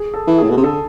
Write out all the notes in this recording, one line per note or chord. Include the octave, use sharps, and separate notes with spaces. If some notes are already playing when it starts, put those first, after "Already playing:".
Already playing: G#4
A4
E3
A2 G#4
B2
C3
D3 A4